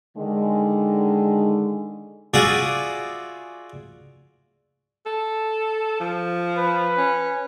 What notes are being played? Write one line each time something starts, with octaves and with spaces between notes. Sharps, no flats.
D3 D#3 G#3
F4 F#4 G#4 D5 E5 D#6
A4
F3
B4
C#4